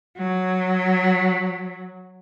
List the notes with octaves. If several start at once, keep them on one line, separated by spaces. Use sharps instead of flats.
F#3